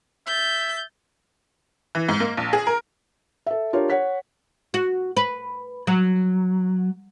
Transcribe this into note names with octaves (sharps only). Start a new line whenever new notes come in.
E5 G6 A6
E3
G#2
A#3
A#1
G#4
A#4
A4 E5
D4 F4 G4 A#4 C#5
C#5 F#5 B6
F#4
B4
F#3